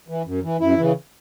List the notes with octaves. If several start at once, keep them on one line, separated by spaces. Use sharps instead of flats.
E3
F#2
E3
F#2 E4
C#3 E3